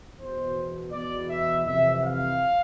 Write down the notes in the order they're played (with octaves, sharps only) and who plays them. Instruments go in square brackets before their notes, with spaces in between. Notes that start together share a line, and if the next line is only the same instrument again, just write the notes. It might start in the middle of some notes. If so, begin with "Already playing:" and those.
[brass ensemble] E2 B2 C5
E2 B2 D5
E5
F2 C3 E3 E5
F5